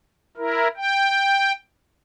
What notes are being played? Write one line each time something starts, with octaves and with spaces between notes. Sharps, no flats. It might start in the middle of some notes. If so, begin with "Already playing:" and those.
E4 A#4
G5